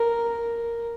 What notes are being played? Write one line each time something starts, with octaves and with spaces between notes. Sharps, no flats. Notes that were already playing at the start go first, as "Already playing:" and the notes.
Already playing: A#4